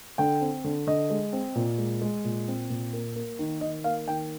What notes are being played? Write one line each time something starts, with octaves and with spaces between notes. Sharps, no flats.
D3 G5
C4
D3
D3 D#5
G#3
C4
A#2
G#3
G#3
A#2
C4
A#2
A#3
A#3
D#3
D#3 D#5
A#3 F5
D#3 G5